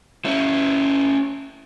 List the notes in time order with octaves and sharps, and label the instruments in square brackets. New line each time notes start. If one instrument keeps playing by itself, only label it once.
[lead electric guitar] C#4 E4